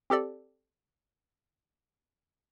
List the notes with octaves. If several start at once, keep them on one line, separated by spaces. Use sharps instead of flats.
C4 G4 A4 D5